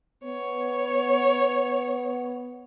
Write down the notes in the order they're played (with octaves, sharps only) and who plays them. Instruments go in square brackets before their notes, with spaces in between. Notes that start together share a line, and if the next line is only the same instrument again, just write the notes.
[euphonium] B3 [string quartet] C#5